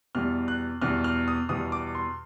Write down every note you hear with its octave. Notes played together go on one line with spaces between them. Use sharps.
E2 B2 G3 F6
F#6
E2 B2 G3 F6
F6
D#6
E2 B2 G3 D#6
D6
C6